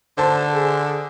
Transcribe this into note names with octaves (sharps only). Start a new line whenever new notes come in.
D3 C5 A5
G#4